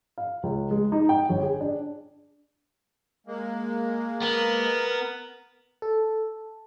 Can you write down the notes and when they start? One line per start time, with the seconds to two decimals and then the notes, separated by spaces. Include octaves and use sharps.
0.18 F5
0.43 C#2
0.71 G#3
0.92 D#4
1.09 G5
1.29 G1
1.42 G#4
1.61 D4
3.27 G#3 A#3
4.22 B3 A#4
5.82 A4